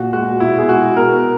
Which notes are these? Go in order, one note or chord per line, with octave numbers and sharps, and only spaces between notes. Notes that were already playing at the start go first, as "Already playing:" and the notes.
Already playing: A#2 F#4
G#3 F#4
B2 E4
G#4
G#3 F#4
B2 A#4